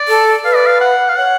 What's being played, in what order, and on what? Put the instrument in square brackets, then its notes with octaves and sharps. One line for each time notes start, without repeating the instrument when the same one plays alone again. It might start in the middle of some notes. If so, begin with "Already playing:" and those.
Already playing: [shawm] D5
[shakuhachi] A4
[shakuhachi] B4 [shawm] F5
[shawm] D5
F5
F#5
F5
[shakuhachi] C#5 [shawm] F#5